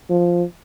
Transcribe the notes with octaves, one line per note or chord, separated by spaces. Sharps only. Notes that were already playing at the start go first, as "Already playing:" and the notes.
F3